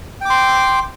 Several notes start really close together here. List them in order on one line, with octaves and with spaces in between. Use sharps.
G5 D6 C6